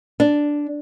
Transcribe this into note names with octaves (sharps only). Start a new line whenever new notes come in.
D4